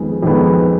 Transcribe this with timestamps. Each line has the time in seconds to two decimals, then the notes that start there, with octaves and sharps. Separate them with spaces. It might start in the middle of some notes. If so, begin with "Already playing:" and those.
Already playing: F2 D#3 G#3 B3
0.23 F2 D#3 G#3 B3